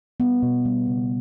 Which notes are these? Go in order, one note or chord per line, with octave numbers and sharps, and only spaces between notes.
G3 B3
B2
G3
C#3